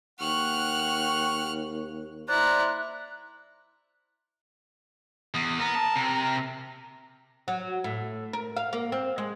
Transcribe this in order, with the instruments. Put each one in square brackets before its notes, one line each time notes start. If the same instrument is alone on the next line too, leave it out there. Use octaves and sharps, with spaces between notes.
[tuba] D#2 [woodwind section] F#5 G5 C#6 [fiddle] F6 F#6
[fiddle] E4 A#5 [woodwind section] C5 D5 [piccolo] F#6
[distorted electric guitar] E2 [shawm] D#6
[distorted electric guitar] B3 [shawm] A#4
[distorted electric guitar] A5
C3
[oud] F#3
A2
A#4
F5
A#3
C4
G#3